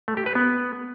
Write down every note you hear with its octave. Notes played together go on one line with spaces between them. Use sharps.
A3
G4
B4
B3